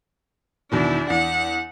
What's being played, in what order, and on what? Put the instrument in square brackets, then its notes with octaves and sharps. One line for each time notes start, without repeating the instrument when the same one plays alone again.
[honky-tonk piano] E2 B2 D#3 [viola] D4 E4
[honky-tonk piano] E2 [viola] F#5